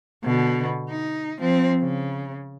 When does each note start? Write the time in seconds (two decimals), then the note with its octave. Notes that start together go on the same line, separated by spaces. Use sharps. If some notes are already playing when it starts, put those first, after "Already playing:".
0.24 B2 D3
0.89 D#4
1.39 F3 C4
1.82 C#3